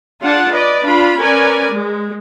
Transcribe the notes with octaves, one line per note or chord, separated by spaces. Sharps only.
D4 F4 G#4 F#5 A5
B4 D5 D#5
D4 F4 B5
C#4 A#4 B4 D5 G#5
G#3